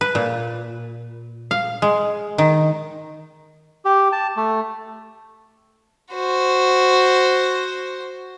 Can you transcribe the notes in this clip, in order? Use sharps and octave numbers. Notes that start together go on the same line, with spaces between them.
B4
A#2
F5
G#3
D#3
G4
A5
A3
F#4 C5